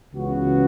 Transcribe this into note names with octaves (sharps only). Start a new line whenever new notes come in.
C#2 C#3 E3 B3 F#4